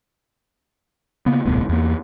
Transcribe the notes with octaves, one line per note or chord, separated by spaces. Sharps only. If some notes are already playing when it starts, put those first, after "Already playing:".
C#3 A#3 B3
D#1 C2 A2 B3
E2 A#3